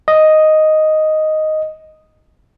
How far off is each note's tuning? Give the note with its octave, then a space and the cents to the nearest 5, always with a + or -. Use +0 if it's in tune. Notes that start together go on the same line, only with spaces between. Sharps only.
D#5 +0